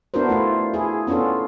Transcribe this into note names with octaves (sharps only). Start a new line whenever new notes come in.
B3 D4 E4 F#4 A#4 C5
A3 E4 F4
E4 G#4
B3 C#4 D4 F4 A4